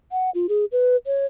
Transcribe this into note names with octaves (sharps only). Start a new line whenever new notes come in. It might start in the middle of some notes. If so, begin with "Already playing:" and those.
F#5
F4
G#4
B4
C#5